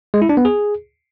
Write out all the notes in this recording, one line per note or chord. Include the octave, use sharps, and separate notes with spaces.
G#3
E4
D4
B3
G#4